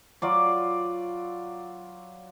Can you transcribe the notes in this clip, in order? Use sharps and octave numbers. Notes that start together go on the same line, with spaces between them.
F#3 F4 D5